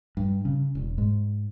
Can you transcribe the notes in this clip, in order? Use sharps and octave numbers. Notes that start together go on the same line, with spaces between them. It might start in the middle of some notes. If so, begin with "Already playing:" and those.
G2
C#3
E1
G#2